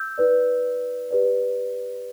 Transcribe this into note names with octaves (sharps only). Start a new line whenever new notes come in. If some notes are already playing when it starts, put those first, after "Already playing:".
Already playing: E6 G6
E4 B4 D5
G4 B4 D5